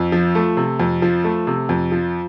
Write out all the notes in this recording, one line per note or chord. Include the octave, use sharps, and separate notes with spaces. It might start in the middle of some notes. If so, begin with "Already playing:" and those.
Already playing: F2
F3
A3
C3
F2
F3
A3
C3
F2
F3